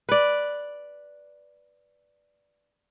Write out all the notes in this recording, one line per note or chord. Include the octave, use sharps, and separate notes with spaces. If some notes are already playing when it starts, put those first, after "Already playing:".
B4 D5